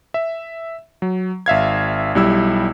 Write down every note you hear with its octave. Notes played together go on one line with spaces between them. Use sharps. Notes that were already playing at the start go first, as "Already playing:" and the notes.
E5
F#3
G#1 E5 F5 G#6
B1 G3 E4 E6